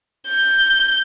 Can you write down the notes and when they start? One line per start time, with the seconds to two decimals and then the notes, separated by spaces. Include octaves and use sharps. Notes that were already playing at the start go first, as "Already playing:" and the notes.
0.28 G6